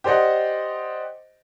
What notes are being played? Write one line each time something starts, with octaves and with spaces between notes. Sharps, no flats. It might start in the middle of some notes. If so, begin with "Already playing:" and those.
G4 C5 D5 D#5 F#5